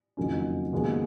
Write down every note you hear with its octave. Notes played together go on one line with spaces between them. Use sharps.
F#1 F2 D#3 F#3 C#4
D#2 C#3 G#3 B3 F#4